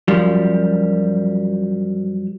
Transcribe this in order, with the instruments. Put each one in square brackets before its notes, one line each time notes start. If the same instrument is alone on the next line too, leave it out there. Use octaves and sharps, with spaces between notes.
[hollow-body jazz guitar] F#2 F3 G3